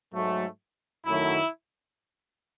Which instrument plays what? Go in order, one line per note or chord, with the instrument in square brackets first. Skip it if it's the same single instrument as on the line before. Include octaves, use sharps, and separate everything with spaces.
[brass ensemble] G#2 F#3 A3
F#2 D#3 F#3 A3 E4